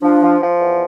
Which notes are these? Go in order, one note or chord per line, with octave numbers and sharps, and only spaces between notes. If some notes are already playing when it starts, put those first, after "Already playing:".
F3 D4
F3
F3
E2